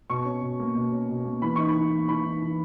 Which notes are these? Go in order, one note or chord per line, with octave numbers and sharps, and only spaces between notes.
B2 C#6
C#4
B2
A#3
B2
C#4
B2
A#3
E3 B5
D#4 C#6
B5
E3
A#3
E3 B5
D#4
E3